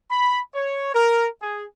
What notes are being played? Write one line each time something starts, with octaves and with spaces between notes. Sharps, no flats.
B5
C#5
A#4
G#4